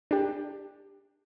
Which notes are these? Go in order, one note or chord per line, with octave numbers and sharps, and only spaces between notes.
D4 G4